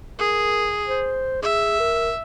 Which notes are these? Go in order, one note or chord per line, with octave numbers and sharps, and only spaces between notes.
G#4 A#4
C5
G#4 E5
A#4